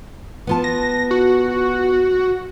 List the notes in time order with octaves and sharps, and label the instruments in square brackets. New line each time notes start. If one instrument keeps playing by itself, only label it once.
[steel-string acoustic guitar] B3 F4 A5
[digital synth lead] A#6
F#4